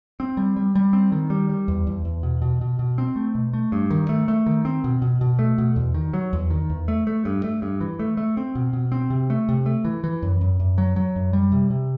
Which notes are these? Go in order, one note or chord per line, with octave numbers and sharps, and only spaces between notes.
C4
G3
G3
G3
C4
D#3
G3
G3
E2
E2
E2
B2
B2
B2
B2
C4
A3
B2
A3
G2
D#3
A3
A3
D#3
C4
B2
B2
B2
A3
B2
E2
D#3
F#3
E2
D#3
E2
A3
A3
G2
A3
G2
E3
A3
A3
C4
B2
B2
C4
C3
A3
C3
A3
E3
E3
F#2
F#2
F#2
F#3
F#3
F#2
G3
C3
C3